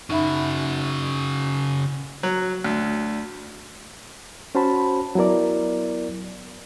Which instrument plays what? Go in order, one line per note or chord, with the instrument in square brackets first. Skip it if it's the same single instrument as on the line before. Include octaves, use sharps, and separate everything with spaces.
[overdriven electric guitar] C#3 F#4 [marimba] D#4 E5 B5
[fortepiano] F#3
D2
[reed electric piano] C#4 F#4 C5 A5 B5
F#3 B3 E4 A#4 D5